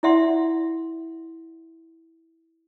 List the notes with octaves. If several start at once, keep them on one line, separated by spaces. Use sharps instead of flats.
E4 F4 D5 E5 F#5 C6